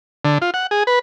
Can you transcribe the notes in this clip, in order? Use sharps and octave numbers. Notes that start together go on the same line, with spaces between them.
D3
F4
F#5
G#4
B4